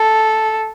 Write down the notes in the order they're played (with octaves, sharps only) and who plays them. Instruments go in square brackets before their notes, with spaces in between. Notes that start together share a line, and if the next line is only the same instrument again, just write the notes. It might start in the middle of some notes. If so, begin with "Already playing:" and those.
Already playing: [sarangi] A4